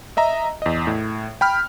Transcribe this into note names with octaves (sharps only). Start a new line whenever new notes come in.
D#5 E5 A#5
E2 D#5
A2
G5 B5 F6